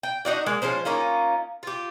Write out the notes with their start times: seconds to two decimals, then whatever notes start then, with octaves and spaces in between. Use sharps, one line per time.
0.03 G5
0.25 D4 D#4 F#4 D5
0.46 G#3 A#3
0.62 F3 G#3 C#4 C5
0.85 A#3 C#4 D#4 F4
1.63 F4 G4